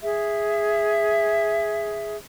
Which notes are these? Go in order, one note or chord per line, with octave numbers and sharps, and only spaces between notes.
G#4 E5